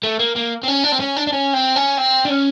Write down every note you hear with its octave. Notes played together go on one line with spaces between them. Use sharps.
A3
A#3
A#3
C4
C#4
D4
C4
C#4
D4
D4
C#4
C4
C#4
C4
D4
C#4